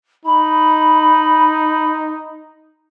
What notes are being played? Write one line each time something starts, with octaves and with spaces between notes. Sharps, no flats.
D#4 B5